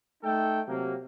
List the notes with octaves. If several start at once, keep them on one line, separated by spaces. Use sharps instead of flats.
A3 D#4 A4 G5
C3 F#3 A#3